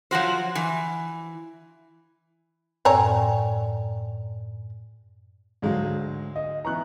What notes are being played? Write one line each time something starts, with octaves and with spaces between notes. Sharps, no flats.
F3 F#3 F#4 C5
E3
F#2 A2 C4 C#5 D5 G5 G#5 A#5
D2 G#2 F#3 G#3 F5
D#5
E3 B3 E4 A#5 C#6 F#6